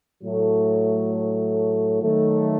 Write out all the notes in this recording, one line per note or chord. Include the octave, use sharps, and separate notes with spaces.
A2 F#3 A3
D#3 F#3 A3